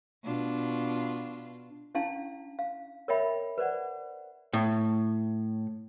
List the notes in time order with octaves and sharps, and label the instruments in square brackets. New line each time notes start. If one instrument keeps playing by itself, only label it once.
[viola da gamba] B2 D4 F4
[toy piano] C#4 D4 E4 F5 A5
F5
A#4 C#5 D#5 E5 G5 B5
B4 C5 D5 F#5
[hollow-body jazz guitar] A2